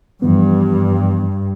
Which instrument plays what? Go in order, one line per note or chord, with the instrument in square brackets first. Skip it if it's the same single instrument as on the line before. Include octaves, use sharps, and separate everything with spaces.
[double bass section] G2 [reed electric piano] E3 F3 B3